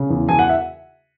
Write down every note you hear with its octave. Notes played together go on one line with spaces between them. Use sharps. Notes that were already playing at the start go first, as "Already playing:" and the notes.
Already playing: C#3
E2
E2 G#5
F#5
E5